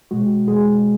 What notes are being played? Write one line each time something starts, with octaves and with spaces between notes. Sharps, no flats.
B2 G#3 F#4
B2 G#3 G#4